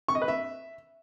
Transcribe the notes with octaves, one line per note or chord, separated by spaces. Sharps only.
C#6
D#5
B4
E5